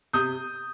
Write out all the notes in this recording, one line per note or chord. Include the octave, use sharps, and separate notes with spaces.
C3 D#6 G6